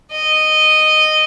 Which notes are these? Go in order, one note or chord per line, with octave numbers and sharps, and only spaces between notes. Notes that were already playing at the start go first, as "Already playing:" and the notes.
D#5